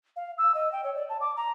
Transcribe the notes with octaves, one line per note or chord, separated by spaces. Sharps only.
F5
E6
D#5
G5
C#5
D5
A5
D6
A#5